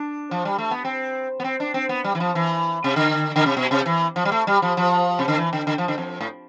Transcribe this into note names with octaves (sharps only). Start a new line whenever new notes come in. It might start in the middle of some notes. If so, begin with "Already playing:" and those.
Already playing: D4
F3
G3
A3
B3
C4
B3
C4
D4
C4
B3
G3
E3
F3
E3
C3
D3
D3
C3
B2
C3
E3
F3
G3
A3
G3
F3
F3
C3
D3
E3
D3
D3
F3
D3
F2
A2